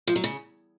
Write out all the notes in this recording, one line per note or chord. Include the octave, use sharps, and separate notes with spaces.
F3
F#3
C#3